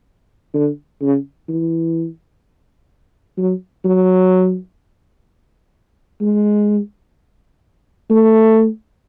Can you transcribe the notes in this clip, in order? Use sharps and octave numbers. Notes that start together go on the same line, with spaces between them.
D3
C#3
E3
F#3
F#3
G#3
A3